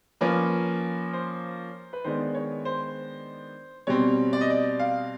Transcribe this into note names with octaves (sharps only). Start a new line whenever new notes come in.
F3 A#3 C#4 B4
C5
B4
D#3 G#3 B3 D4 C5
C#5
C5
B2 G3 C4 C#5
D5
D#5
D5
F5